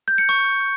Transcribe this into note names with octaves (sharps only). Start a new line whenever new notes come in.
G6
C#7
C#6